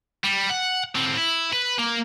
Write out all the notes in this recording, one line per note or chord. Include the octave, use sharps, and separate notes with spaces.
G3
F#5
A2 C4
E4
B4
A#3